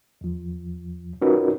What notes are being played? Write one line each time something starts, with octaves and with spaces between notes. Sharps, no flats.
E2 F3
C#4 D#4 F4 F#4 A#4 B4